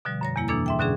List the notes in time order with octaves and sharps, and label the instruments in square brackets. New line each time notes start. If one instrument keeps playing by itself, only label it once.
[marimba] B2 D3 F3 G3
F#2 C#5 A#6
E2 G3 A#3 E4
B2 E3 A#3 D4 A4 E6
G#2 E5 G5
B2 D3 F#3 C#4 D4 G#4